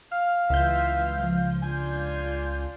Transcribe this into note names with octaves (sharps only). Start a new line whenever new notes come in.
F5 F6
C#2 E3 F4 E5 G6
F3
D4 F4 G#5